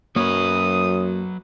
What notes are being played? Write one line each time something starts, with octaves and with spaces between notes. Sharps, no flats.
F#2 F#3 A#3 B4 C#5 D#6